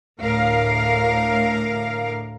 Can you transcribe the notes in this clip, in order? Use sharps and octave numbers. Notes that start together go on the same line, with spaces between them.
D2 A2 A#4 F5